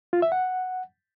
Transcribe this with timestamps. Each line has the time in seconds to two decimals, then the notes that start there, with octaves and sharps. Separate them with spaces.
0.13 F4
0.22 E5
0.32 F#5